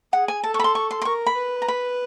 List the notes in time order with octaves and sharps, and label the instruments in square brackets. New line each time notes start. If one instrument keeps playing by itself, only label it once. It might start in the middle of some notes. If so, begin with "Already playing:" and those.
[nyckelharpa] G#4 [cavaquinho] F#5
[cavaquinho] G#5
[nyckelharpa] A4 [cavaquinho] A5
[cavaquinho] C#6
B5
C6
C#6
C6
C6
[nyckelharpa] A#4 [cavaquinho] C#6
[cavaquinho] B5
[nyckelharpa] B4
[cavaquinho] A#5
B5